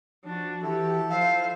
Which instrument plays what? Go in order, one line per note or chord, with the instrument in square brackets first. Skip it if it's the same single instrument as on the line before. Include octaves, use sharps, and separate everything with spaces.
[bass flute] F3 [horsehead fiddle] D4 F#4
[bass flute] E3 [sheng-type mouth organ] E4 A4 [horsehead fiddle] F#4 G4
[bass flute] F3 [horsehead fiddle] C5 E5 [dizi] F5